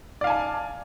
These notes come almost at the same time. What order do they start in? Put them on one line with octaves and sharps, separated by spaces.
D5 F5 G#5 A5